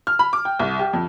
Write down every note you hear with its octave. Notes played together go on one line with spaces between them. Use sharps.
F6
B5
D6
G5
C2
G4
F2